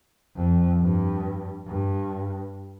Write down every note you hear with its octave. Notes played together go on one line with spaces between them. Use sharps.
F2
G2
G2